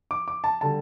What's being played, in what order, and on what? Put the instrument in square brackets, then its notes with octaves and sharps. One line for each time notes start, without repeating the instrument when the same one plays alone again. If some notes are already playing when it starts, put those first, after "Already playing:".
[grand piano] D6
D6
A5
D3 G3 A5